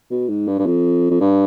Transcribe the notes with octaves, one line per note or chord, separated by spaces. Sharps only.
B2
G#2
G2
G2
F2
F2
G2